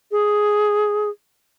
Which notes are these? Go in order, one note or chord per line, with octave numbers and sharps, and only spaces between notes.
G#4